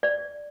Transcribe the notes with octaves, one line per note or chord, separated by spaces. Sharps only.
D5